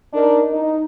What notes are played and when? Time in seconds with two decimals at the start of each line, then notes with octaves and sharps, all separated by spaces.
0.14 D4 D#4 A#4
0.52 D#4